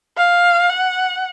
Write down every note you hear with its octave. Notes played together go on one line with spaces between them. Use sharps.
F5
F#5